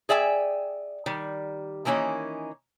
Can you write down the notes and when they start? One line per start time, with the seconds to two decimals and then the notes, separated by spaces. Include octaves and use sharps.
0.09 G#4 D5 E5 G5 G#5
1.06 D#3 G3
1.85 D#3 E3 A#3 C#4 D#4